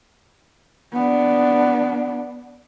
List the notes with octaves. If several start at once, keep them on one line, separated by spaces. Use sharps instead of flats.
B3 D4